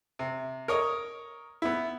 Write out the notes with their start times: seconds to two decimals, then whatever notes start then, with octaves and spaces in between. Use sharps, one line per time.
0.19 C3
0.68 A#4 C#5 D#5
1.62 B3 E4